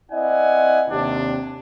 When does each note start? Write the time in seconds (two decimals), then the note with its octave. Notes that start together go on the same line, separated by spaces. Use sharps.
0.11 C4 E4 D5 D#5 F#5 G#5
0.89 D#2 C3 D4